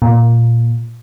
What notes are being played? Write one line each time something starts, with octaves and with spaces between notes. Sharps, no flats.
A#2